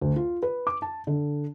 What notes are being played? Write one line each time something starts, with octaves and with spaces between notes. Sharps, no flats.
D2
F4
B4
D6
A5
D3